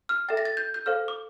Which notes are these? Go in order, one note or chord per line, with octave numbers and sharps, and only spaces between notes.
F6
A4 E5 G5 A6
A#6
A6
G6
G6
A4 C5 F5 F6
D6